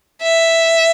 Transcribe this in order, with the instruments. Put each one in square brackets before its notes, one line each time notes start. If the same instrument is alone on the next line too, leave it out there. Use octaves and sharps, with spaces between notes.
[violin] E5